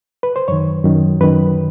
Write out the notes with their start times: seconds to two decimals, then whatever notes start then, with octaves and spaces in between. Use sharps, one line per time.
0.23 B4
0.36 C5
0.48 F#2 D#3 C#5
0.84 F#2 D#3
1.21 F#2 D#3 B4